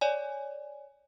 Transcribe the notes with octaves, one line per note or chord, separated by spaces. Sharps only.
C#5 D5 G#5